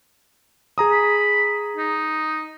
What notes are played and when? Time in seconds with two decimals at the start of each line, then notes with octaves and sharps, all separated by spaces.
0.78 G#4 A#5 D#6
0.92 B5
1.76 D#4